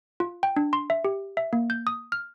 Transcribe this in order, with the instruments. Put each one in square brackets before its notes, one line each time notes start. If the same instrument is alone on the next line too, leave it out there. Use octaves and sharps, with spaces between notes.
[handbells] F4
G5
D4
C6
E5
G4
E5
A#3
G6
D#6
F6